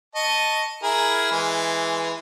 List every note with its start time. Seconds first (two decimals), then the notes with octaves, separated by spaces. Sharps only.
0.15 D#5 A5 C#6
0.83 E4 G#4 A#4
1.31 E3 G#3